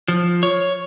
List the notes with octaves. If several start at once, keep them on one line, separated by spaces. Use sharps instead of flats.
F3
C#5